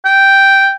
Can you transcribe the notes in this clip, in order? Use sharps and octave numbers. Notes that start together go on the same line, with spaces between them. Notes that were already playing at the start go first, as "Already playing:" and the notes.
G5